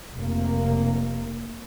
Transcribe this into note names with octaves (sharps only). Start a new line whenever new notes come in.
F1 A#3